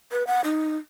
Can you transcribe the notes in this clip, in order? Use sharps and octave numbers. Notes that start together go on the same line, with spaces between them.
B4
F#5
D#4